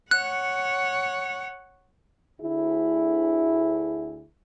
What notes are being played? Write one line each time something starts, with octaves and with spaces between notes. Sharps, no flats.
C#5 F#5 F#6
D2 E4 G#4